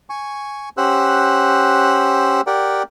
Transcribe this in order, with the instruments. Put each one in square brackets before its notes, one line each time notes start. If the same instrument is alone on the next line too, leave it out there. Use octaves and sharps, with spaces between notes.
[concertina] G#5 C#6
C#4 G4 C5 F#5 E6 F#6
G4 A#4 D5 F#5 G5